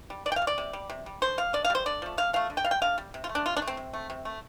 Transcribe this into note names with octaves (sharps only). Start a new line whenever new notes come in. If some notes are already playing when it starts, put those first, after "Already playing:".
G3
D3 D5
G5
F5
G3
D5
C3
G3
C3
G3
D3 C5
G3 F5
D3 D5
F5
G3 C5
D3 D5
F3 A3
D3 F5
F3 A3 F5
D3
G5
G3 F5
G5
D3 F5
G3
C3
F4
A3
D4
C3 F4
D4
A3
C4
C3
A3
C3
A3